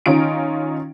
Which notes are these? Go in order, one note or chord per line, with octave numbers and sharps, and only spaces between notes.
D#3 C#4 D#4 F4 D7